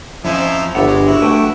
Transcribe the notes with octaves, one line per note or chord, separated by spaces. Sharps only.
F2 F3 C#4 D#4 E4 C5
G1 A3 D4 E5 F#5 B5
G#3
E4 F#4
A3 B4 G5